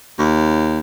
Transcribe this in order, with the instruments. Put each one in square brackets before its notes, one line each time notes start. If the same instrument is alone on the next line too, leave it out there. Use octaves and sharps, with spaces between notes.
[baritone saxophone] D#2